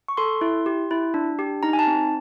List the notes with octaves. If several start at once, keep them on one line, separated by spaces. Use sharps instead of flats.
C#6
A4 C6
E4
G4
E4
D4
G4
D#4 A#5
G#5
A5
C4